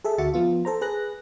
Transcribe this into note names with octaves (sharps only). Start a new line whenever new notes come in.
G#4 A4 E5
D2 F#4 E5 A6 C#7
F3 B3 F4
A4 C5 A#5
G#4 B4 F#6 A#6